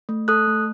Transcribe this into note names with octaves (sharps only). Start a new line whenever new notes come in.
A3
A4 D#6 F#6
A3